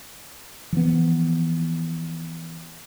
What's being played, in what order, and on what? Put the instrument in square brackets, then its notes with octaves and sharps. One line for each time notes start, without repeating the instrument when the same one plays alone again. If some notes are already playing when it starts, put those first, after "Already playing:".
[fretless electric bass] E3 F3 B3